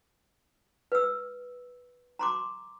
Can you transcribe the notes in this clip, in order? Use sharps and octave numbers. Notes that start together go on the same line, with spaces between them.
B4 E6
A#5 C6 D6